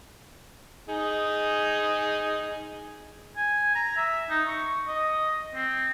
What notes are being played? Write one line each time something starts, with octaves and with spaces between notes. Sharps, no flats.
D#4 G#4
G#5
A#5
E5
D#4
C#6
D#5
C4